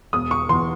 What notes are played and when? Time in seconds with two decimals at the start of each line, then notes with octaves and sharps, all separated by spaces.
0.13 E1 D#6
0.31 C#6
0.49 E2 C6